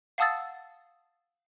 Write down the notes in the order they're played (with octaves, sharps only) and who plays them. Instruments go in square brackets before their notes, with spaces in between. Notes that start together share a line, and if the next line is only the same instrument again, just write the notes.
[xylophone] F5 F#5 A5 D#6 E6 A6